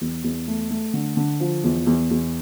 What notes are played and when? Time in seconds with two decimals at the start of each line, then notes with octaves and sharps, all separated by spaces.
0.01 E2
0.24 E2
0.48 A3
0.71 A3
0.94 D3
1.17 D3
1.40 F3
1.64 E2
1.87 E2
2.11 E2